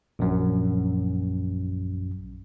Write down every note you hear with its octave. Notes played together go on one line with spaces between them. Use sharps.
A#1 F#2